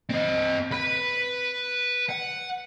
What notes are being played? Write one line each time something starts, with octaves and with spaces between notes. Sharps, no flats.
C4 D#5
B4 B5
F#5